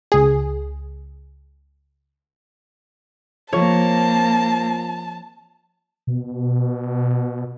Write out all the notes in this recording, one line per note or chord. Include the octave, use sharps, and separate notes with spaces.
C#2 G#4
F3 A#3 C4 F4 C#5 A5 F7
B2